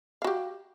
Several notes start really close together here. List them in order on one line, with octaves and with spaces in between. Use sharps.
F5 F#4 G4